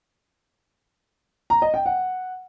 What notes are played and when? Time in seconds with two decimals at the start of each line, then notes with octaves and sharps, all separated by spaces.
1.50 A#5
1.62 D#5
1.74 G5
1.86 F#5